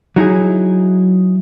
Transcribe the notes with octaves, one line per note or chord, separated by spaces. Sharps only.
F#3 D#4 E4 G#4